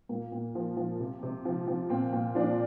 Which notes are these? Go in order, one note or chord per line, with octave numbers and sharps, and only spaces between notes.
A#2 A#3
A#2
F3
F3
C3
C3
F3
F3
A#2 C4
A#2
F3 D4